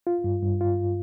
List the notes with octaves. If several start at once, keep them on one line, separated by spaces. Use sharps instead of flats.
F4
G2
G2
F4